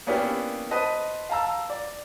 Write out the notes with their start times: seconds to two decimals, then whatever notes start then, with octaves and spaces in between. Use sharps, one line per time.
0.07 A#3 B3 C#4 D4 E4 G4
0.71 B4 C5 D#5 A5
1.29 F5 A5 A#5 E6
1.70 D5